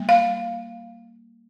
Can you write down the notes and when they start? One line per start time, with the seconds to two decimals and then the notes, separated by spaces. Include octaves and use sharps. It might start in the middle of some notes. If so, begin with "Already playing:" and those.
Already playing: G3 A#3
0.09 F5